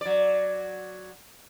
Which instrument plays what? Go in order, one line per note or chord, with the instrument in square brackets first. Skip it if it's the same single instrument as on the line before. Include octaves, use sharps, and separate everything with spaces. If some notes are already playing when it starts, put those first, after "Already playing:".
[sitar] F#3 D5